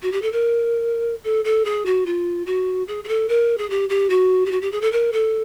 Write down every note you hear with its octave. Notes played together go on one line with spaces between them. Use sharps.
F#4
G4
A4
A#4
A4
A4
G#4
F#4
F4
F#4
G#4
G#4
A4
A#4
G#4
G4
G4
F#4
G4
F#4
G4
G#4
A4
A#4
A4